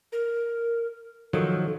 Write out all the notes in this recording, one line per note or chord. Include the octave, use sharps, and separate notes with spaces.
A#4
D#3 F3 F#3 A4